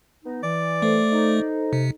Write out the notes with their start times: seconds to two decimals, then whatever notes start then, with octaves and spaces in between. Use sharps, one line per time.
0.25 B3 D#4
0.43 E3 D5
0.82 A3 A4 C5
1.12 D#4
1.73 C3